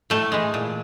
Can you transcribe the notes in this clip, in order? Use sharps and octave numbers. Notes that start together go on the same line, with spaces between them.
A2 A3
E3 G#3
A#2